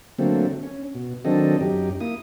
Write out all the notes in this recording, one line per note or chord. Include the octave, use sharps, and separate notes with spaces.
D3 F#3 A3 A#3 C4
C#4
B2
D#3 F#3 C4 D4 A4 D#5
F#2 D#4 G4
A#3 E4 D#6